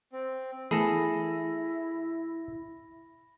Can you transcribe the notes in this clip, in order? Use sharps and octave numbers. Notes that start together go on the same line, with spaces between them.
C4
E3 A3 B3 E4 G#4 A4 B5 A#6